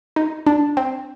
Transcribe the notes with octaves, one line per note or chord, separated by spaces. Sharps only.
D#4
D4
C4